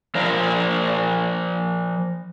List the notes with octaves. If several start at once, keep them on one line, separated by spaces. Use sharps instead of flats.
F3 A#4 C5 D5 A#5